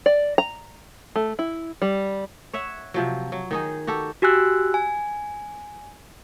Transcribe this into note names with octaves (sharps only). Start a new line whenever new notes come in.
D5
A#5
A3
E4
G3
C#5 E5 F#5
C3 F3 F#3
F#3
D#3 D#4 G#4
F#4 G4 A4
F#4 G4 G#5 E6 F#6
G#5